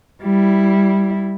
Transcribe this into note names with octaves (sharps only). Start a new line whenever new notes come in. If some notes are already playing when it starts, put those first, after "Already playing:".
G3 E4